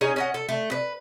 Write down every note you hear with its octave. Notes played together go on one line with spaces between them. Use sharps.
C#4 D#4 G#4
C#4 D#5 F#5
A4
A3
B4